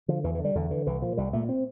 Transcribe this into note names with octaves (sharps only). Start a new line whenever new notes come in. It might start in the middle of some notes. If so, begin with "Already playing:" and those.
D3 F3
E2 E3
E3
D3
G3
E2 D3
D3 E3
C2 E3
A#2 F3
C2 G3
A#2 A3
C4